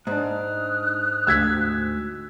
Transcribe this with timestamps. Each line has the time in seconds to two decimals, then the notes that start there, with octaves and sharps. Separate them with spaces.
0.07 G#2 D4 D#6 F6 F#6
1.27 D2 E6 G#6 B6